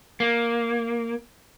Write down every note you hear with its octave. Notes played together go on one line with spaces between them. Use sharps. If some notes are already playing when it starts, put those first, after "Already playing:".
A#3